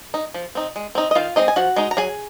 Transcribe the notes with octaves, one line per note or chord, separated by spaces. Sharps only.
D#4
F3
C4 D#4
G#3
C4 D#4
D#5
D#3 F4 F5
G#3 C4 D#4 D#5
G#5
F3 F#4 F#5
G#3 D#4
A#5
F#3 G#4 G#5